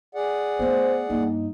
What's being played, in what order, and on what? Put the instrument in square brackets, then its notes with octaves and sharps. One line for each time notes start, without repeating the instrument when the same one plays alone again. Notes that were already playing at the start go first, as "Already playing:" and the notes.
[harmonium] G#4 D5 F#5
[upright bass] A3 B3 [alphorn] C5
[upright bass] G2 A#3 [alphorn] D#4